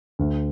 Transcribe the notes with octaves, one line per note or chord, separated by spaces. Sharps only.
D2